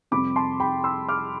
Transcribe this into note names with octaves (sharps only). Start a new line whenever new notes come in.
F2 C3 G3 C4 B5 D6
A5 C6
G5 B5
C6 E6
D6 F6